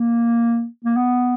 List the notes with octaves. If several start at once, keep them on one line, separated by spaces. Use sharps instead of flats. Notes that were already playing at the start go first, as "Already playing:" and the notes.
Already playing: A#3
A#3
B3